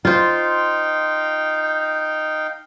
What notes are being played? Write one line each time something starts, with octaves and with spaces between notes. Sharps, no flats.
D#4 F4 C5 F5 G5